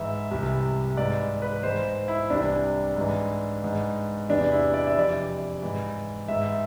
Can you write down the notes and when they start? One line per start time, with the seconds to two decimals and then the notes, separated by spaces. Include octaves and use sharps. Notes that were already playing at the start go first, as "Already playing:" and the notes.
Already playing: G#2 E3 E5
0.31 C2 C3 E3
0.97 G#2 E3 D5
1.42 B4
1.63 G#2 E3 C5
2.08 E4
2.30 C2 C3 E3 D4
2.96 G#2 E3
3.64 G#2 E3
4.29 E2 C3 E3 D4
4.52 E4
4.74 D5
4.87 E5
4.97 F2 C3 E3 D5
5.62 G#2 E3
6.28 G#2 E3 E5